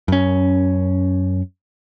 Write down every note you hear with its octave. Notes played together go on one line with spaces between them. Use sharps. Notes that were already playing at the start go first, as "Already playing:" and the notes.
F#2 C#4